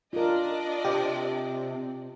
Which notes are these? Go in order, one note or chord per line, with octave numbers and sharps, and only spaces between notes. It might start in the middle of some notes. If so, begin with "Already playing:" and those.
D4 F4 A#4 D5 D#5
C3 G4